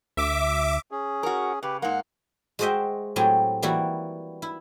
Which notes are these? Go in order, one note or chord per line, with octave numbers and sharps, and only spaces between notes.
D2 E5 D6
C#4 G#4
F#4 A#4
C#3 G4 B4
G#2 A#3 F#5
G#3 F#4 C5 D#5 E5 G5
A2 F#3 C4 G4 G#5 A#5
E3 G3 A#3 E4 F#4
E4